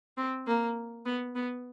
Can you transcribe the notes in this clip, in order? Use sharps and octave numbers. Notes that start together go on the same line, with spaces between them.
C4
A#3
B3
B3